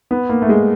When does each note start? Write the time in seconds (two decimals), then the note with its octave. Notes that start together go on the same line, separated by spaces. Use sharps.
0.11 B3
0.29 A#3
0.42 A3
0.49 G#3